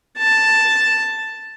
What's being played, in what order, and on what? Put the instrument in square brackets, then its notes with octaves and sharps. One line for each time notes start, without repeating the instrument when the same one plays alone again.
[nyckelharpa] A5